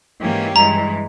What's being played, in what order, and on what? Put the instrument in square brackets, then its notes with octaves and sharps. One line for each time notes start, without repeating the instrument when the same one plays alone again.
[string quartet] G#2 E3 A#3 C#4 G4
[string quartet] G2 E3 G#3 [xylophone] A#5